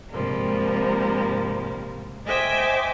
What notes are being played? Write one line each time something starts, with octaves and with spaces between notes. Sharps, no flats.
G#2 C3 F3 G3 A#3
C5 D#5 E5 G5 G#5 D6